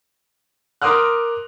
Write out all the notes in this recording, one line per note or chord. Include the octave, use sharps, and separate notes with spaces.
A#4 C6 D6 D#6 F6 F#6